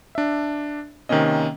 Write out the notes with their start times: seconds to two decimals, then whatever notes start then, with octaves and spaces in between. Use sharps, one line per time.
0.15 D4 E5
1.09 C3 D#3 A#3 C4 C#4 D#5